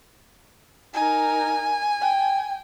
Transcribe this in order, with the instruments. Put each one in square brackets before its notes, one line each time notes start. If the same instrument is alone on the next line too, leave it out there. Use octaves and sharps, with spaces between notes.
[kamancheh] D#4 A#4 [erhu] G#5
[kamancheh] G5